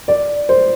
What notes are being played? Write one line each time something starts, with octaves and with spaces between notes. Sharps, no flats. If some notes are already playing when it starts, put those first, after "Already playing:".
D5
C5